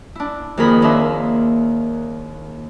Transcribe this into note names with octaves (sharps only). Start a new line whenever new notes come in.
D4 E4
F2 D#3 A#3 G#4 A#4 B5
D#2 D4 A#4 E5 C6